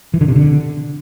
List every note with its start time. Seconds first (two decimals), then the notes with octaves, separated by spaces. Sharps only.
0.14 E3
0.21 D3
0.28 C3
0.36 D3